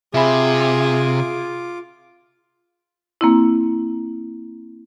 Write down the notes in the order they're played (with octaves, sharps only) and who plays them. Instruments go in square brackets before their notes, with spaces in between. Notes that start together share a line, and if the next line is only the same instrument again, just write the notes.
[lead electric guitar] C3 [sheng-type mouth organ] F4 D6 [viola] G#4 [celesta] E5 G#5 B5
[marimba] A#3 C4 E4